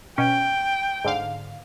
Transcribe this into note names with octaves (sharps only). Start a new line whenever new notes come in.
B2 C#4 G5
G#2 D3 F5